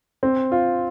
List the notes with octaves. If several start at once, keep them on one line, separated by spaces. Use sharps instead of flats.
C4
F4